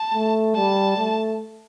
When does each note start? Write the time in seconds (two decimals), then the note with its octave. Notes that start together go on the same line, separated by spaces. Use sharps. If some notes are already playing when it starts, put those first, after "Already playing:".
Already playing: A5
0.14 A3
0.55 G3 A5
0.98 A3